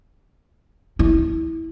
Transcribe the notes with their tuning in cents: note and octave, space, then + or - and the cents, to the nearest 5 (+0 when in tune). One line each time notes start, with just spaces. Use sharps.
E4 -20